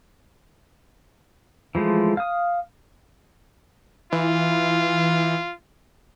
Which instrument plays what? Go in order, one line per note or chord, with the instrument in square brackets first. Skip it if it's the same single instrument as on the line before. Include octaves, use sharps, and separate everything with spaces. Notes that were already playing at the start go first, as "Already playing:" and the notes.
[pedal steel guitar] E3 F3 G#3 A3
F5 D#6
[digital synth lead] E3 [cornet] F4